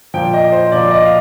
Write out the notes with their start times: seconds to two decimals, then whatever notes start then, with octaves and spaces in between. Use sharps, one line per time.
0.14 A#2 F3 G5
0.34 D#5
0.52 C5
0.72 A#2 F3 D5
0.91 D#5
1.05 F5